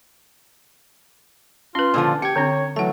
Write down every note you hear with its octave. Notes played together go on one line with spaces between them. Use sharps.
C#4 F4 B4 C6
A#2 D3 F3
G4 G5 G#6 C#7
D3 C4 D4 C#5
E3 F#3 A3 F#5 A5